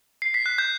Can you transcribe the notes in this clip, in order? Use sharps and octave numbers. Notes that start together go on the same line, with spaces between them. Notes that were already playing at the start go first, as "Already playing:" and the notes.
C7
B6
F#6
G6